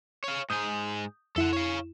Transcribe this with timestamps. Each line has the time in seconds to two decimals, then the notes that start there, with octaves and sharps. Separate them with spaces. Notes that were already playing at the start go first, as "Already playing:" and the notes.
0.24 C#5 F5
0.50 G#2 G#4 D#6 G6
1.36 F2 E4 A4 F#5 E7
1.53 C#5 F5